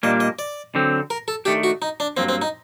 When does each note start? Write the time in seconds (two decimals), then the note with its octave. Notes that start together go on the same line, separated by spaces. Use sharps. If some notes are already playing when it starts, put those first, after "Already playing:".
0.03 A#2 G3 A#3 D4 D#5
0.20 D#5
0.39 D5
0.75 D3 F#3 C4
1.10 A#4
1.28 A4
1.45 D#3 A3 D4 G4
1.63 F#4
1.82 D#4
2.00 D4
2.17 G2 F#3 A#3 C4
2.29 C4
2.42 D#4